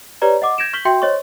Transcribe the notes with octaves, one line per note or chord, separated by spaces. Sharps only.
G4 B4 C#5 D5 A#5
D#5 F#5 D6
G6 G#6 A#6 C#7 D7 E7
C#6 F6 G6 B6 F#7 G7
F#4 E5 G5 C6 G6 C#7
C5 C#5 D#5 C6 C#6